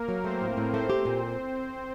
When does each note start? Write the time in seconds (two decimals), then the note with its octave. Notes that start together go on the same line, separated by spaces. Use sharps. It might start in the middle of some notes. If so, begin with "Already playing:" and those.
Already playing: A#3 A#4
0.08 F#3
0.24 A3 C4 C5
0.41 A2
0.57 A2
0.74 A3 C4 C5
0.90 G4
1.05 A#2